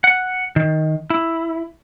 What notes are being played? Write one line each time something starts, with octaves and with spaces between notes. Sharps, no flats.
F#5
D#3
E4